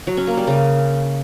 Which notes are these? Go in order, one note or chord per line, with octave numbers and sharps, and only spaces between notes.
F#3
C#4
A#3
G3
C#3